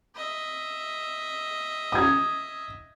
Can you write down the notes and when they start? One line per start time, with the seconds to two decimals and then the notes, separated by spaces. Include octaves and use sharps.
0.15 D#5 E5
1.92 D#6 G#6